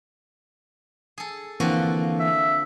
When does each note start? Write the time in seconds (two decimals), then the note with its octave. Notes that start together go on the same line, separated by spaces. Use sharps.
1.18 G#4 A4
1.60 D3 E3 F3 A#3 C4 F#4
2.20 E5